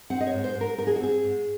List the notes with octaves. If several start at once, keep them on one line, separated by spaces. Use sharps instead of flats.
C4 F#5
D#5
C#5
G#2
C5
G#2
A#4
G#2 A#4
G#4
F#4
C4 G#4
G#2